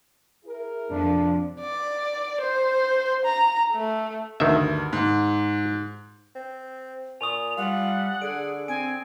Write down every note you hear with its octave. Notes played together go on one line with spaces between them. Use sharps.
E4 G#4 A#4
F2 C3 F3 D4
D5
C5
A#5
A3
D2 G2 D#3 E5
G#2
C4
A#2 G#5 C#6 D#6 F7
G3 F4 F#5
D3 G#4 D7
C4 G#5 D7